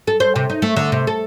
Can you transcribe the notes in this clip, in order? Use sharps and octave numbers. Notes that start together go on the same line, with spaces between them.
A4
C5
C3
D#4
A3
D3
C3
A4